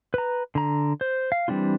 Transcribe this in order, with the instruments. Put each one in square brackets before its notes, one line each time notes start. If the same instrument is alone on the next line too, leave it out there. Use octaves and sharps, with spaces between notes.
[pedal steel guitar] B4 A#5
D3 A#5
C5
F5
E3 G3 C4 D4 F4